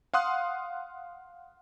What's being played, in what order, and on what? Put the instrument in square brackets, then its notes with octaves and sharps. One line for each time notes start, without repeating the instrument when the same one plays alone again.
[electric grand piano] F5 F#5 C6 D#6 F#6